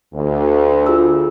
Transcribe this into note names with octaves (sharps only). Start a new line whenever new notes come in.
D2
F4 G#4 E6